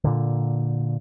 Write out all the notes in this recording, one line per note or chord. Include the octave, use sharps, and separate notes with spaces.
A#2 D3